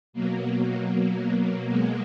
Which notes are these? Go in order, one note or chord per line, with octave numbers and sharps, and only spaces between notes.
B2 F#3 A#3
G#3